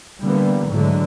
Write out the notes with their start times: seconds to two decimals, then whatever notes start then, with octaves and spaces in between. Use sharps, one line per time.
0.20 D3 E3 G3 A#3 B3
0.69 G#2 D3 E3 F#3 G#3 A3